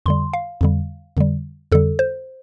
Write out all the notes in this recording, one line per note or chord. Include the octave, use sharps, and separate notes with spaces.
F2 D3 G3 C6
F5
F2 D3 G3
F2 D3 G3
F2 D3 G3 A4
C5